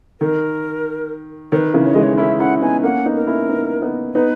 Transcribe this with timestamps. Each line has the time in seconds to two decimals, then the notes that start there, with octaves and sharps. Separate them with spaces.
0.21 D#3 A#4
1.52 D#3 B4 C#5
1.74 C#3 E3
1.85 C#5
1.94 E3 G#3 D#5
2.03 C#5
2.18 C#4 E4 E5
2.39 C#4 E4 F#5
2.62 B3 D#4 G#5
2.83 A#3 C#4 F#5
3.06 B3 D#4
3.16 A#4
3.27 C#4 E4
3.49 B3 D#4
3.82 B3 D#4
4.14 B3 D#4 B4